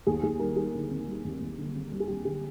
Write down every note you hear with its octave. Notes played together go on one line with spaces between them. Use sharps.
D#2 G#4
D#2 G#4
G3 A#4
G3 G#4
D3
C4
G3
D#2
D#2
D3
C4
G3
G#4
G3 G4
D3 G#4